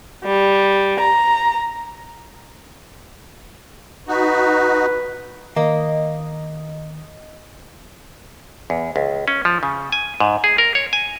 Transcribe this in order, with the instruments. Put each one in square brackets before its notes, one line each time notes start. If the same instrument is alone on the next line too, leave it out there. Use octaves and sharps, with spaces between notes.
[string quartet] G3
A#5
[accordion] D#4 F#4 [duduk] B4
[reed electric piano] D#3 [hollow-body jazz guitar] A#3 [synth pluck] D#5
[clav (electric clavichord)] E2
C#2
C#4
F3
C#3
G#5
G#2
G#4
A#4
C#5
G#5